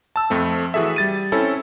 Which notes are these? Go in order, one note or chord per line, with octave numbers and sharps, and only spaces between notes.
A5 E6
F2 A3 C4
E3 F#4 G#4 A4 E5
G3 A6 D#7
C4 C#4 E4 A4